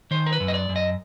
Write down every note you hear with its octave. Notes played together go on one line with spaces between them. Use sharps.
D#3 C5
A#4
B4
F#2
D#5
D5
F#2
D#5